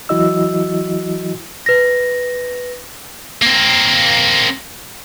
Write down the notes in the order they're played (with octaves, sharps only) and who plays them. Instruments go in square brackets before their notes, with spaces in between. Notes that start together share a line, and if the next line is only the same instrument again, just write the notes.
[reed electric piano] E3 F#3 E4 F#4 D#5 E6
[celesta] B4 A#6
[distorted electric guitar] A#3 C4